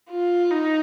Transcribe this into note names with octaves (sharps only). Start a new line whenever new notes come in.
F4
D#4